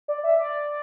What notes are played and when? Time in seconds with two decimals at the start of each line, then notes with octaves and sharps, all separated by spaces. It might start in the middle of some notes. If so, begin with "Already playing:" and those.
0.08 D5
0.23 E5
0.39 D5